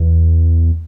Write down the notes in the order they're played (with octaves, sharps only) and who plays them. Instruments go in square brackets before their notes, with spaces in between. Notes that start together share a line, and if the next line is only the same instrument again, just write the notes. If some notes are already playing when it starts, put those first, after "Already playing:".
Already playing: [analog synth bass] E2